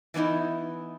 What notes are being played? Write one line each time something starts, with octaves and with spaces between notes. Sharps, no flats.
E3 B3 C#4 D#4 E4